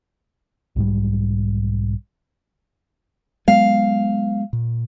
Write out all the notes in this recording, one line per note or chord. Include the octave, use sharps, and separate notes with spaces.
B1 G#2 G3
F#3 G#3 B3 F5
A#2